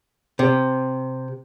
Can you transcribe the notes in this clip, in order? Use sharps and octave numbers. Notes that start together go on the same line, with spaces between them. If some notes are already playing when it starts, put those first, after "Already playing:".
C3